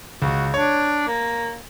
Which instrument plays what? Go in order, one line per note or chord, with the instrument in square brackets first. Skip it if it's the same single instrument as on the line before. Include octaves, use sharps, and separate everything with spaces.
[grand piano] C#2 [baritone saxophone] F#4
[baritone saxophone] D4 [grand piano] C#5
[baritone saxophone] A#3